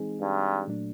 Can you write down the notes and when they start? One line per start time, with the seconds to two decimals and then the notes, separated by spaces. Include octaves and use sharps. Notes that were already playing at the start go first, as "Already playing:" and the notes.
Already playing: E3 G#3 C4 D#4 G#4
0.21 G2
0.67 A#2 F#3 A3 D4